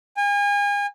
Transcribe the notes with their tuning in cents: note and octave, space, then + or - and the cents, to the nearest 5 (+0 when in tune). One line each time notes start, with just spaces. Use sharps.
G#5 -35